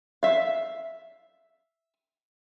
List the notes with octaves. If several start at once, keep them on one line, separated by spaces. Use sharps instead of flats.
E5 F5